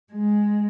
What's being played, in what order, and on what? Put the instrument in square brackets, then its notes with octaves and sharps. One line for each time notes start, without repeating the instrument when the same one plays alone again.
[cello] G#3